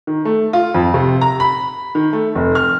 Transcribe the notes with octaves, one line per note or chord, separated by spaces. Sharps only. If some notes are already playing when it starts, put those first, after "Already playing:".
D#3
A3
F4
F2
C3
A#5
B5
D#3
A3
F1
F6